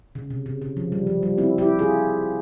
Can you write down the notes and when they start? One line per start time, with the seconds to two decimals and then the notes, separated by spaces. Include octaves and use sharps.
0.15 C#3
0.30 C3
0.46 C#3
0.62 C#3
0.77 F3
0.92 G3
1.07 F3
1.23 G3
1.38 C4 E4
1.58 E4 G4
1.79 F4 G#4